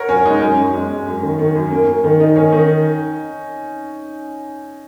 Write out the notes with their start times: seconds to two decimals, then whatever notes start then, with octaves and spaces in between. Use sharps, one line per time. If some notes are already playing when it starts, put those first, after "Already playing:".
Already playing: A#4 C#5 F#5
0.09 F#2 C#4
0.25 G#3 D#4
0.41 F#2 C#4
0.57 F#2
0.74 G#3
0.90 G#3
1.06 F#2
1.23 D#3
1.39 D#3
1.55 F#2
1.71 A#3
1.87 A#3
2.04 D#3
2.20 D#4
2.36 D#3 C#4
2.52 D#3 D#4